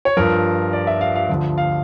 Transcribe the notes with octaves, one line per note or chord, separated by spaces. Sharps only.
C#5
G2 F3 A#4
D5
E5
F5
F5
D2 D3 F3
F5